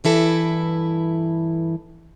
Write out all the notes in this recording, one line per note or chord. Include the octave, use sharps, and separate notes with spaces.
G2 E3 E4 A4 B4